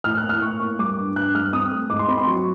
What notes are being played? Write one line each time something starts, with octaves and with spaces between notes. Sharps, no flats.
A2 F6
F#6
A#3
F6
A2 C#6
A#3 C#6
G3 D6
G2
G2 F#6
G3 F6
C4 D#6
A3
G#2 D6
C6
C4 B5
C6
F#3 C#6